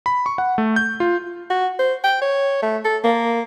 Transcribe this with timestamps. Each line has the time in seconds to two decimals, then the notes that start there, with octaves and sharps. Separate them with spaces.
0.06 B5
0.26 C#6
0.38 F#5
0.58 A3
0.76 G6
1.00 F4
1.50 F#4
1.79 C5
2.04 G5
2.22 C#5
2.63 A3
2.85 A4
3.04 A#3